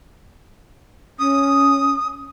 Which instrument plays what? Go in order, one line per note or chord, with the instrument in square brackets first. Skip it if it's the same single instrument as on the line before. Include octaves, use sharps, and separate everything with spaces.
[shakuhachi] C#4 [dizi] D#6